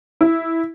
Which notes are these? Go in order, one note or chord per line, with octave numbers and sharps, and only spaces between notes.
E4